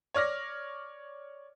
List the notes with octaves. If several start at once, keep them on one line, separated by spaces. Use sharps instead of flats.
C#5 D5 F6 A#6